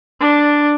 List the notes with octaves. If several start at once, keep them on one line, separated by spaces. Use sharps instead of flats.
D4